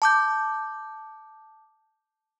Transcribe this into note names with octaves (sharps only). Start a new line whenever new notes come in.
A5 D6 G6